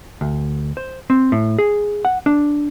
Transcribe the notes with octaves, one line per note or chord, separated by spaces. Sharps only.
D2
C5
C4
A2
G#4
F#5
D4